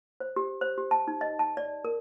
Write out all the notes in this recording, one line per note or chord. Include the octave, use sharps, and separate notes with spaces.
C5
G4
C5
G4
A5
D#4
D#5
A5
D5
A#4